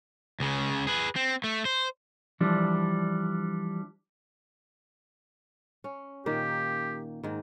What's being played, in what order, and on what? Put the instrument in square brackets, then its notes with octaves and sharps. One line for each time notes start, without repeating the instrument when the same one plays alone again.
[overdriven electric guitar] C#2 C#3
G#4 B4
C4
A3
C5
[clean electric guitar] E3 F3 G3 D4
[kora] C#4
[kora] A#2 D#3 A#3 [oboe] G4
[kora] G#2 D#3